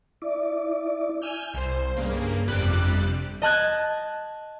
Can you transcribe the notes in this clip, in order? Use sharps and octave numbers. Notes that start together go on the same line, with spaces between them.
E4 D5
G#5 E6 F6 G6
C2 C5
G2 C#3 A#3
G1 F2 C3 G3 D6 F#6
D#5 A5 F#6 G#6